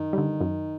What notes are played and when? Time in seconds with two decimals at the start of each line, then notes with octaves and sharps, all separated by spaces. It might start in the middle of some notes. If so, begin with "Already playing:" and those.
Already playing: F#2 D#3
0.13 D3 G3
0.41 F#2